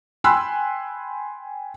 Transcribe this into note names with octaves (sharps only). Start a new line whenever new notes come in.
G5 G#5 B5 C6 E6 F#6